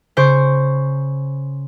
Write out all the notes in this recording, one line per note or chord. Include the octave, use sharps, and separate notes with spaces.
C#3 C5 C#6 D7